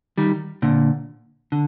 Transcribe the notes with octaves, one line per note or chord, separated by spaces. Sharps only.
D#3 G3
A#2 D3
D3